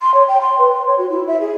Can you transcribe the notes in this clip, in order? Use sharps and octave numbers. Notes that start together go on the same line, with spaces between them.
C6
C#5
G5
C6
B4
C6
C#5
F#4
E4
E5
G#4